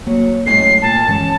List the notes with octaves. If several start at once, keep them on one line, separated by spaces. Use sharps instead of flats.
F#3 A#3
F#2 A2 G#3 C7
A#2 D#3 A5
G2 E3 G#3 C#4